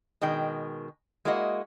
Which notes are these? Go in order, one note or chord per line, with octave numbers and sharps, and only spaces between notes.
B2 D#3 G#3 G5
G#3 A#3 E4 F#4 A4 D#5